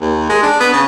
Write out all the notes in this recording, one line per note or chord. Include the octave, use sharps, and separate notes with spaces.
D#2
G#3
D4
B3
C#3